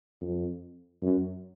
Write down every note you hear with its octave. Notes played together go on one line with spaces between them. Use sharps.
F2
F#2